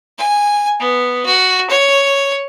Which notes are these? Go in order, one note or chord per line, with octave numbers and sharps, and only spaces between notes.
G#5
B3
F#4
C#5